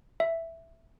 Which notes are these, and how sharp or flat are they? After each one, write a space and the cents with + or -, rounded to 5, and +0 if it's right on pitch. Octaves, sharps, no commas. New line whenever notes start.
E5 +5